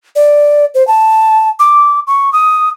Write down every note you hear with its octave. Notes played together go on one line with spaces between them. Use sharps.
D5
C5
A5
D6
C#6
D#6